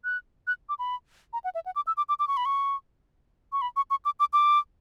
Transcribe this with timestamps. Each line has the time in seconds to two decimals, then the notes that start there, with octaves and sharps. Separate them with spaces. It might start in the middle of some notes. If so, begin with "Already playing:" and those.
0.04 F#6
0.47 F#6
0.69 D6
0.79 B5
1.33 A#5
1.44 F#5
1.55 E5
1.66 F#5
1.76 D6
1.87 E6
1.97 D6
2.09 D6
2.19 D6
2.28 C#6
2.37 B5
2.45 C#6
3.53 C#6
3.62 B5
3.76 C#6
3.90 C#6
4.05 D6
4.20 D6
4.33 D6